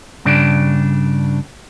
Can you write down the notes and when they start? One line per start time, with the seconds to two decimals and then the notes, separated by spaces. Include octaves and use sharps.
0.25 G2 C#3 D4